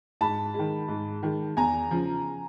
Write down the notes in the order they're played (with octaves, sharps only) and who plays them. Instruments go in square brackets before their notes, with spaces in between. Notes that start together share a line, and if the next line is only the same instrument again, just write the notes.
[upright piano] G#2 [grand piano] A5 B5
[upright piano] D#3 G#3
G#2
D#3 G#3
[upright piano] E2 [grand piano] G#5 A#5
[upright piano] C#3 F3